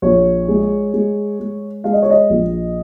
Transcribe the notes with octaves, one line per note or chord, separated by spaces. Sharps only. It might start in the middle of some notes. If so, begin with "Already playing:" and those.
A#1 C#5
G#3
G#3
G#3
G#3 F5
D#5
C#5
D#5
A#1